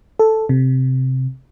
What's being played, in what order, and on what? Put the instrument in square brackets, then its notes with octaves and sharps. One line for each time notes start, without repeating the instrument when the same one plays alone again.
[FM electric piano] A4
C3